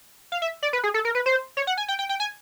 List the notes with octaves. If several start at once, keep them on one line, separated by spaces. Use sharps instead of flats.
F5
E5
D5
B4
G#4
A4
A#4
B4
C5
C#5
F#5
G#5
G5
G5
G5
G#5